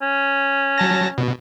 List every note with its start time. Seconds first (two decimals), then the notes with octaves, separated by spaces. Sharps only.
0.02 C#4
0.78 F#3 A5 A#6
1.18 B2